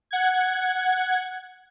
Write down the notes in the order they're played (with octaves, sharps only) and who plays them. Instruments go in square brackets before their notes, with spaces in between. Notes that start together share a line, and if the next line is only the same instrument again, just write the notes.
[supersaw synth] F#5 G#6